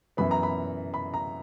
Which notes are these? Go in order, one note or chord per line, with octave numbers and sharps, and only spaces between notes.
F#2 E3 B3 B5
A#5
B5
B5
A#5